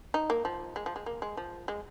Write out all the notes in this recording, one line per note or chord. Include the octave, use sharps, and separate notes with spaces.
D#4
A#3
F3
G#3
F3
G#3
A#3
G#3
F3
G#3